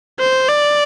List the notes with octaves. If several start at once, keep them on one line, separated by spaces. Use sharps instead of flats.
C5
D5